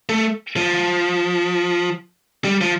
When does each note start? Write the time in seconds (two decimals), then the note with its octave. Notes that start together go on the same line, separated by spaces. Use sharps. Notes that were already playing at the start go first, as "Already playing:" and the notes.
0.09 A3
0.56 F3
2.45 G3
2.61 F3